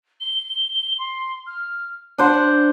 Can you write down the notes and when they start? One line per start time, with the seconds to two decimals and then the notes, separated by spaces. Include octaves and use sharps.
0.21 G7
0.99 C6
1.47 F6
2.18 D4 C5 F#5 F#6